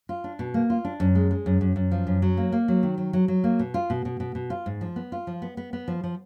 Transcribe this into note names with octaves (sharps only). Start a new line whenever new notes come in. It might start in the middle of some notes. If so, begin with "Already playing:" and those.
F4
D4
B2
A#3
F4
D4
F#2
G#3
G#3
F#2
F#2
F#2
F3
F#2
F#3
A#3
A#3
F#3
D#3
F#3
F#3
F#3
A#3
B2
F4
B2
B2
B2
B2
F4
G#2
F3
B3
F4
F3
B3
B3
B3
F3
F3